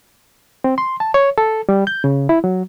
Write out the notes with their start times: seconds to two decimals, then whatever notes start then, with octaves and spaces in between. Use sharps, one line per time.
0.64 C4
0.78 C6
1.00 A5
1.14 C#5
1.38 A4
1.69 G3
1.87 G6
2.04 C#3
2.29 E4
2.44 F#3